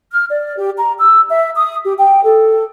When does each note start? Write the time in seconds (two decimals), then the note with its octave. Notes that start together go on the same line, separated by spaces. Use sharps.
0.13 F6
0.30 D5
0.57 G4
0.78 A#5
0.99 E6
1.30 E5
1.55 D#6
1.83 G4
1.98 G5
2.24 A4